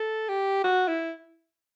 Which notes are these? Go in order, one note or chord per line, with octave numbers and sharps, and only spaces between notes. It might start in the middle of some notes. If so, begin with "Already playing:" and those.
Already playing: A4
G4
F#4
E4